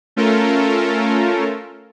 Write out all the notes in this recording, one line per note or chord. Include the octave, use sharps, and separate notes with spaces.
A3 C#4 F4 A4 A#4